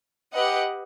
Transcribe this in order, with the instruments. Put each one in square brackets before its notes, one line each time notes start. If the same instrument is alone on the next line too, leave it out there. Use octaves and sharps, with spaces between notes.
[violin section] G4 B4 D#5 F#5